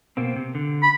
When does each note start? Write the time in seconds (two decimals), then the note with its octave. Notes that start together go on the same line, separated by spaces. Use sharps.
0.17 B2 A#3 C4
0.36 C3
0.55 D3
0.83 B5